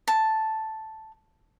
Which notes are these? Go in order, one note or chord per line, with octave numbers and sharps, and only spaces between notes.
A5